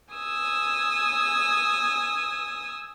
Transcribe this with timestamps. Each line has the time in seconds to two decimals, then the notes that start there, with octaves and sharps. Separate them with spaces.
0.14 G#5 D#6 E6